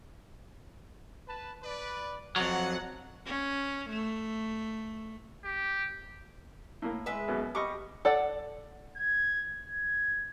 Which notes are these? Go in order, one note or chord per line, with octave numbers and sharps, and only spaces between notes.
B4 A5
B4 D5
F2 F#3 F#5
C#4
A3
G4
A2 A#3
G#3 B4 E5
F#2 B2
G3 D#5 C#6 D6
A4 D5 F#5
G#6
G#6